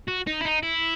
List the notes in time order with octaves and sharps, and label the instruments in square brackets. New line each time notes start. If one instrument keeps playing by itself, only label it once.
[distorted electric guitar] F#4
D#4
E4
D#4
E4